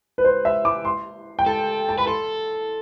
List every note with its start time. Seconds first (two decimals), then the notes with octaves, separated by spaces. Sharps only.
0.18 B4
0.24 C5
0.45 E5
0.65 D6
0.85 C6
1.39 G5
1.46 A4 A5
1.89 A5
1.98 B4 B5
2.07 A4 C6